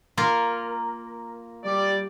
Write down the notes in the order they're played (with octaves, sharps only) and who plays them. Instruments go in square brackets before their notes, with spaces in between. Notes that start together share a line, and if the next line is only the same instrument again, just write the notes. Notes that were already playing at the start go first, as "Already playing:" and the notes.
[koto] A#3 F4 A#4
[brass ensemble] G3 D5